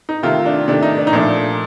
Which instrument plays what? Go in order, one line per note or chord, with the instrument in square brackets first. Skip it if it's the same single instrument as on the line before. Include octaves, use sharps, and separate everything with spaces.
[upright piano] D#4
C3 D#3 A3 F4
D4
C3 D#3 A3 D4
D#4
D4
D#4
A#2 F3 A3 D4